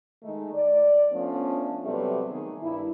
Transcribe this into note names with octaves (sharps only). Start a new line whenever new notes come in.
D#3 G#3 A3 D#4
D5
F3 A3 B3 C#4 D4
C3 F#3 G3 A3 B3
D#3 G#4
G2 E4